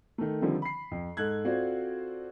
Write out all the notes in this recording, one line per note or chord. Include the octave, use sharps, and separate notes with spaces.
D#3 A3
D3 D#3 F3 G3 C4
B5 C7
F2
G#2 A4 F#6 G#6
C4 F4 F#4 A4 C5 D5